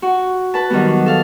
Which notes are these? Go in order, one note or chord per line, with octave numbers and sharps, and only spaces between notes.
F#4
B4 A5
D#3 F#3 G3 B3
A4 F5